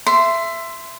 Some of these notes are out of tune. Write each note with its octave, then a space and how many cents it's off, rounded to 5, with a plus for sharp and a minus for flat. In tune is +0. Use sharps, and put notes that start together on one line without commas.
E5 +20 C6 -10